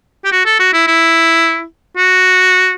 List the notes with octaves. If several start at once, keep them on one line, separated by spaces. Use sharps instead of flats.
G4
F#4
A4
F#4
E4
E4
F#4